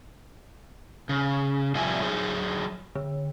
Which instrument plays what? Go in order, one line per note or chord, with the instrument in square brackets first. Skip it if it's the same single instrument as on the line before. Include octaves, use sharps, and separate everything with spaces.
[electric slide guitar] C#3
C3 F3 G3 C4 E4 G#5
F#3 G#4 C5
[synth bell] D3